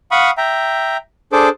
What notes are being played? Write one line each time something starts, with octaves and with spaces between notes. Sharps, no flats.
F5 F#5 B5 C#6 D#6
E5 G5 A#5
D4 G#4 A4 C5 D6